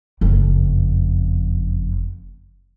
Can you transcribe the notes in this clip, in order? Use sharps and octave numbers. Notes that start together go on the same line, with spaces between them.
F#1 F2